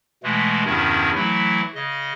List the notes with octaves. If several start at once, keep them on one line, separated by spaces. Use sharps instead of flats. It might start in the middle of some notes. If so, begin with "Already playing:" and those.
B2 E3 G#3 A3
E2 G2 C3 D#3 C#4 E4
E3 F#3 A3 E4
C#3 D#5